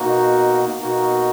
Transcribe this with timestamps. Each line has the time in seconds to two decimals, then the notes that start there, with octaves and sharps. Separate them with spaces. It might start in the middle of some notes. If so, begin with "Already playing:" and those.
Already playing: B2 A#3 D#4 F#4
0.78 B2 A#3 D#4 F#4